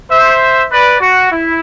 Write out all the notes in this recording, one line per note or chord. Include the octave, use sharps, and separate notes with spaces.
C5 E5
B4 D5
F#4
E4